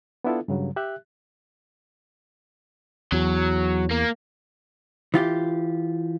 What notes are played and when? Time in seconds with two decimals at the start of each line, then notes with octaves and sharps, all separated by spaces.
0.24 B3 D4 E4 F4 A4
0.48 G2 C#3 F#3
0.76 G4 E5 F#6
3.12 E2 F#3
3.91 A#3
5.14 E3 F4 G4